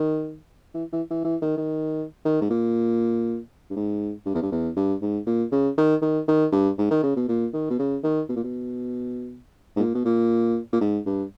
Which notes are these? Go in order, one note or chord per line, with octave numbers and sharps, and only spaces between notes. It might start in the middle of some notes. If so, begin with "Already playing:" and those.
Already playing: D#3
E3
E3
E3
E3
D#3
D#3
D#3
G#2
A#2
G2
G#2
G2
E2
G2
E2
G2
G#2
A#2
C#3
D#3
D#3
D#3
G2
G#2
D#3
C#3
B2
A#2
D#3
B2
C#3
D#3
B2
A#2
B2
G#2
A#2
B2
A#2
A#2
G#2
G2